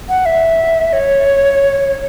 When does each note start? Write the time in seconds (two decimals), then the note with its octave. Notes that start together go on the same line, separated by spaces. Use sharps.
0.09 F#5
0.26 E5
0.93 C#5